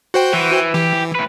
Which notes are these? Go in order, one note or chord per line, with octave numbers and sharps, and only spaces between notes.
F#4 C5 G5
E3
E3 G4
A2 B4